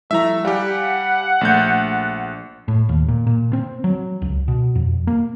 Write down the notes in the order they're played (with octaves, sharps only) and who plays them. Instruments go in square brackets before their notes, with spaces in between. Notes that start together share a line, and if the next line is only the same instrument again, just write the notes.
[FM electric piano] F3 G3 E4 [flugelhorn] A3 [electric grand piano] E5 A#5
[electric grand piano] G3 G4 [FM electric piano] F5 G#5 [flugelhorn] F#5
[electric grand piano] A#1 G6 [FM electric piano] A3 A6
[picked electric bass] A2
D#2
A#2
A#2
C4
F#3
C#2
B2
F2
A#3